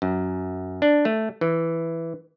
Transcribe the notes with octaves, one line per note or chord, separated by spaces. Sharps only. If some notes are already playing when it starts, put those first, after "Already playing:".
F#2
D4
A3
E3